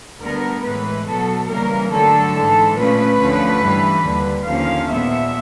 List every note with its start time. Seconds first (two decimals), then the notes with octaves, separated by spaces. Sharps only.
0.20 D2 D3 G3 B3 A#4
0.63 A2 E3 G#3 B4
1.06 B2 F#3 B3 A4
1.48 C#3 E3 G3 A#3 A#4
1.91 G2 D3 F#3 A3 A4
2.34 G#2 E3 G#3
2.76 A#2 F3 A3 C#4 B4
3.19 D2 D3 F3 A3 C#4
3.62 G2 E3 G3
4.04 D#2 D3 G3
4.46 D#2 D3 F3 A#3 C#4 F5
4.89 A#2 F3 G#3 B3 E5